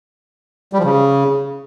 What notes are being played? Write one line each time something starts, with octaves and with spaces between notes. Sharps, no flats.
G3
F3
C#3